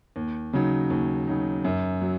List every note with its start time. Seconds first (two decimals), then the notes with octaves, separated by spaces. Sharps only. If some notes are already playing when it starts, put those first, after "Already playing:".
0.16 D#2
0.53 C#3 F#3 D#4
0.90 D#2
1.28 C#3 F#3 D#4
1.65 F#2
2.02 F#3